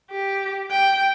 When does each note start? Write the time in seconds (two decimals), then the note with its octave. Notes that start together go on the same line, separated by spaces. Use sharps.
0.10 G4
0.71 G5